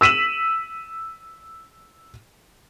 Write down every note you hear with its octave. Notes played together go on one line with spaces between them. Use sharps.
E6 B6 D#7 E7 F#7